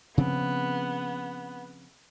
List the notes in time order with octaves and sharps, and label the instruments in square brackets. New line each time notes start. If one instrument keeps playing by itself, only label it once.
[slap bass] C#3 F3 C4 [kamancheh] B3